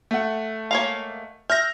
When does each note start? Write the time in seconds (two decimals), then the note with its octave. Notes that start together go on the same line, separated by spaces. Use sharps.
0.11 A3 F#5
0.71 G#3 A#3 C#5 F5
1.50 E5 F6 G6 A#6